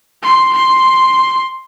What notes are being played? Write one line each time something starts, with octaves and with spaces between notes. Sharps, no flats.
C6
C6